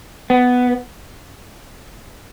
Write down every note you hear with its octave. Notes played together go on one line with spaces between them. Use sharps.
B3